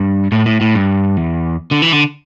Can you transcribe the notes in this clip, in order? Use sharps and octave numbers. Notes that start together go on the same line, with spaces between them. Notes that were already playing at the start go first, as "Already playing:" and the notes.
Already playing: G2
A2
A2
A2
G2
E2
D3
E3
D3